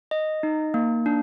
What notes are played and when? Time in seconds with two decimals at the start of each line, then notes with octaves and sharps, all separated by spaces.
0.11 D#5
0.43 D#4
0.74 A#3
1.06 D4